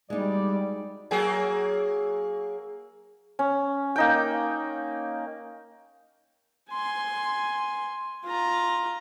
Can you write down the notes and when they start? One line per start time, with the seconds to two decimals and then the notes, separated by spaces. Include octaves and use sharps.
0.10 E2 G3 G#3 D#4 F#4 D5
1.11 F#3 A#3 G#4
3.39 C#4
3.96 A#3 D#4 G5
6.72 G#5 C6
8.26 F4 A#5